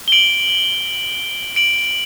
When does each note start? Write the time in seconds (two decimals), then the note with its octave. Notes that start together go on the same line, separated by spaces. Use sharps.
0.08 G7
0.12 D7 F#7
1.56 D7 F#7